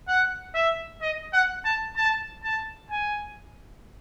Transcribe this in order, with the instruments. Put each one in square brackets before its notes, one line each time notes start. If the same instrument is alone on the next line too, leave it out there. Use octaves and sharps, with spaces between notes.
[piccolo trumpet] F#5
E5
D#5
F#5
A5
A5
A5
G#5